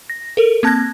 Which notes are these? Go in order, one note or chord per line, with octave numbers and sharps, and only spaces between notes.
A#6
A4 A#4
A#3 C4 A5 F#6 G#6 A#6